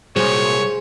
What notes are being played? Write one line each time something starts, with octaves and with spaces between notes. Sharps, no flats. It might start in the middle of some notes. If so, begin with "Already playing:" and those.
C2 A#2 G3 F#4 G#4 C5 C#5